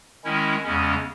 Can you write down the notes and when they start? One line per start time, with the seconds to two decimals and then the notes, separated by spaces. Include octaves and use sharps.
0.24 D#3 G#3 C#4 E4
0.63 E2 C#3 G#3 C#4